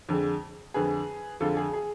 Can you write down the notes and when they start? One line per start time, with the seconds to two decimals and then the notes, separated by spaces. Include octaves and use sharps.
0.09 F2 D3 G#3
0.74 F2 D3 G#3 G#4 B4
1.40 F2 D3 G#3 F4 A4
1.57 G#4
1.74 G#4